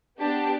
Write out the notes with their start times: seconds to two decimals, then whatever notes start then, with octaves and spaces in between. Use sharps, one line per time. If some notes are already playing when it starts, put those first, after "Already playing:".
0.20 B3 D4 G4 A5